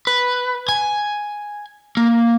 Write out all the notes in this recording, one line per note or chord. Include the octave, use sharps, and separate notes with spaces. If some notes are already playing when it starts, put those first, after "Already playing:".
B4
G#5
A#3